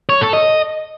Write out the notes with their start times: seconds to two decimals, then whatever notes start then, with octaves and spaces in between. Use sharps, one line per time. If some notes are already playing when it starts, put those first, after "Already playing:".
0.09 C#5
0.21 A4
0.33 D#5